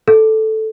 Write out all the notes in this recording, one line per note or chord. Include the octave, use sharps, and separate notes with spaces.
A4